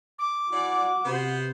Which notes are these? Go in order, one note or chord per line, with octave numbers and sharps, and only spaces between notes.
D6
E3 F#4 D5
C3 B3 C5